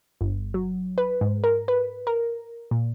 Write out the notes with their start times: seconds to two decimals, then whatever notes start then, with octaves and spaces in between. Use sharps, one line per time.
0.21 G1
0.54 F#3
0.98 B4
1.21 G#2
1.44 A#4
1.68 B4
2.07 A#4
2.71 A#2